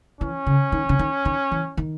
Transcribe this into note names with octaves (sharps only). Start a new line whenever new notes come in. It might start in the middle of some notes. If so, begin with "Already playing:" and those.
E3 C#4
C#3
D#3
C#3
D#3
D#3
E3
D#3